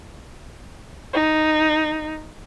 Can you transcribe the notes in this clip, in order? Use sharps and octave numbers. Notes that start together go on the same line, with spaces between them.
D#4